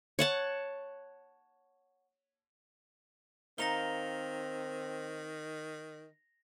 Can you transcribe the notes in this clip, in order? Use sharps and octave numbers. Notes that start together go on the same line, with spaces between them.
C#5 F#5 A5
D#3 C4 D#4 A#4 F5 A#6 F7 G7